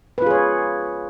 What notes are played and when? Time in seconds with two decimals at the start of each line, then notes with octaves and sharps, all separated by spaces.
0.18 B4
0.22 F4
0.26 G#4
0.31 C#5